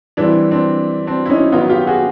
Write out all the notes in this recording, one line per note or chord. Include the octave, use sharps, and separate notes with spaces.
E3 G3 C4 D4 E4
C4 D4
C4 D4
E4
C#4 D#4
D#3 F#3 B3 D#4 F4
F4 G4
F#4 G#4